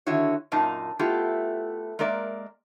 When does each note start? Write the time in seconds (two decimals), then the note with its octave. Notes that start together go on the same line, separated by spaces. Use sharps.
0.07 D3 D#3 E4 F#4 C#5
0.52 F#2 A#2 A#3 D#4 A5
0.99 A3 B3 E4 F4 G4
1.99 G#3 A#3 A#4 D5 E5